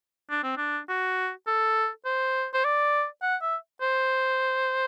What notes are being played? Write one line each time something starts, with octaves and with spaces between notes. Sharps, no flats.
D4
C4
D4
F#4
A4
C5
C5
D5
F#5
E5
C5